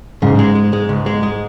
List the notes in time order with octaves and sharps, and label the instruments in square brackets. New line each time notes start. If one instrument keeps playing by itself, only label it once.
[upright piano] G#2 [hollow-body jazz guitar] C#3
[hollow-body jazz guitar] G#3
G#3
G#3
C#2
G#3
G#3